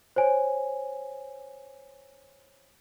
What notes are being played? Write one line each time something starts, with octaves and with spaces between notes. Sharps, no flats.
C5 C#5 G#5